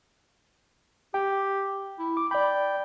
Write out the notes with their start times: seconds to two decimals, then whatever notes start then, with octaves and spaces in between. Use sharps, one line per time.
1.14 G4 G5
1.99 E4
2.17 D6
2.31 D5 G5 B5